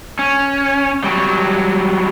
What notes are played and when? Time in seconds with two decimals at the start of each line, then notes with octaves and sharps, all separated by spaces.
0.19 C#4
1.04 F#3 G3